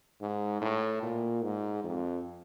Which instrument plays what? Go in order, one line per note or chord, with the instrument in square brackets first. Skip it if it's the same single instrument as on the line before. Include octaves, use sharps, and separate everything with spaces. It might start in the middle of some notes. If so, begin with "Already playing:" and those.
[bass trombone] G#2
A2
A#2
G#2
F2